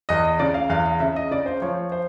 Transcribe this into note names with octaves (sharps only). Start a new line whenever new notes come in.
E2 D#5
D#5
C#3 D5
F5
E2 F5
F5
C#3 E5
D#5
C#3 D5
C5
F3 C#5
C5